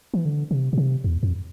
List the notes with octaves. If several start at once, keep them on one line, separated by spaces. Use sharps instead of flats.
E3
D3
C3
A#2
C3
E2
F2